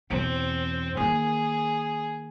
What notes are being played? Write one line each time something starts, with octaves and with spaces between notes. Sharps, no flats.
E2 B2 C4
D#3 A#3 G#4